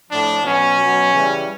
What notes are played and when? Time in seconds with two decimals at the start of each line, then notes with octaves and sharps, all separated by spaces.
0.10 A2 F3 D4
0.44 B2 F#3 C#4
0.79 B2 F#3
1.13 C#3 E3 G3